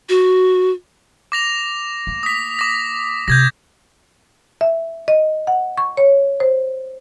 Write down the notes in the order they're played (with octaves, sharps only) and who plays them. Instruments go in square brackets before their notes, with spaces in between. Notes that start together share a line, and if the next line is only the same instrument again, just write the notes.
[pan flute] F#4
[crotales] D6 A#6 F7
[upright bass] A#3
[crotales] D#6 B6
D6 A#6
[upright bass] C3 [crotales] G6 G#6 A#6
[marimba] E5
D#5
F#5
C#6
C#5
C5